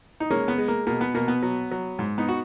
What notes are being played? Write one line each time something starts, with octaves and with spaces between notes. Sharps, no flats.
D#4
G#3 A#3 C#4
B3
G#3
A#3
B2 A#3
B3
B2 A#3
B3
F#3
F#3
G#2
B3 D#4
F#4